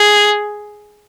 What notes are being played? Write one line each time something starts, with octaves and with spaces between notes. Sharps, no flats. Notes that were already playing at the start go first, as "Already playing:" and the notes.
Already playing: G#4